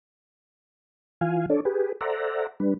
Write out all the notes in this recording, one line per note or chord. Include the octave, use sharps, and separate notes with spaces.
E3 F4 F5 G#5
D4 A4 C#5 D5
G4 G#4 B4
A4 C5 D5 E5 F#5 A#5
G3 D4 B4